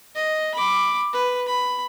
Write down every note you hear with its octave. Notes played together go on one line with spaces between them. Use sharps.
D#5
B5 D6
B4
B5